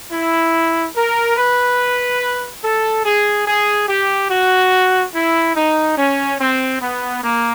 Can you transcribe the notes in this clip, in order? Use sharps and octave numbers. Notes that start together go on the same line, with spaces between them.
E4
A#4
B4
A4
G#4
G#4
G4
F#4
E4
D#4
C#4
C4
B3
A#3